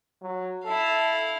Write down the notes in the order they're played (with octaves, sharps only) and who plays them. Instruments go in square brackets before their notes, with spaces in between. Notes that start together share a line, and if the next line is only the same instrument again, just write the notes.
[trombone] F#3
[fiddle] E4 F5 [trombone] A4